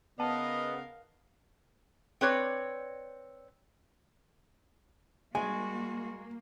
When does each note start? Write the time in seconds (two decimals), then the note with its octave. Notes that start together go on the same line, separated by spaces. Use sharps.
0.20 C#3 B3 A#4 D#5 F5 A5
2.21 C4 B4 C#5 D5
5.35 G3 G#3 A#3 F#4 G#5